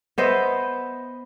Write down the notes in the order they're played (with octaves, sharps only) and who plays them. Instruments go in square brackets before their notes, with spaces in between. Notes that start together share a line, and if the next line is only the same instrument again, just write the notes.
[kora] B3 C5 D#5 E5